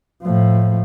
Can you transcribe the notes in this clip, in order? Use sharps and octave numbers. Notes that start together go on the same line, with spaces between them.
A2 F3